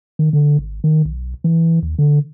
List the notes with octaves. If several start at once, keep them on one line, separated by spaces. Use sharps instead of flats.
D#3
D3
G#1
D#3
B1
E3
D#2
D3